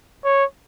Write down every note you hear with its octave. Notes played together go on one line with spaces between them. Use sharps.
C#5